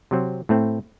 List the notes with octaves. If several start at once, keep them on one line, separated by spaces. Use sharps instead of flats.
C3 F#3 C4
A2 A3 C4